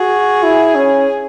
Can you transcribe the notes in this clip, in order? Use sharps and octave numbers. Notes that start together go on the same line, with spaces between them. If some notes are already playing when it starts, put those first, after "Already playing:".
Already playing: F#4 G#4
E4
C#4